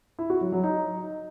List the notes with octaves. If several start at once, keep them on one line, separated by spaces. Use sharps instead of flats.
E4
F#4
F#3
F#3
D#4